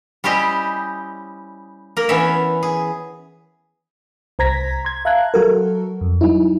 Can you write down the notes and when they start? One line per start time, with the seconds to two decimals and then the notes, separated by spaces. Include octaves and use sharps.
0.24 G3 C#4 E4 G4 C5 D#5
1.97 A#3 A#4
2.09 E3 B3 C#4 C#5 E5
2.63 G#4
4.39 C2 C5 A#5 G#6 A#6 B6
4.85 C6 G#6
5.05 E5 F5 A5 A#5 F#6 G#6
5.34 F#3 F#4 A4 A#4
6.01 F2
6.21 F#3 D#4 E4